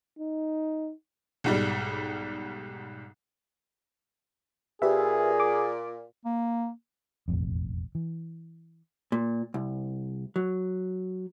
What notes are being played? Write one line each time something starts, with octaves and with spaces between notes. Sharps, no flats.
D#4
B1 G#2 G3
A#2 G4 G#4 B4 E5
D6
A#3
E1 A1 F2
E3
A#2
C2
F#3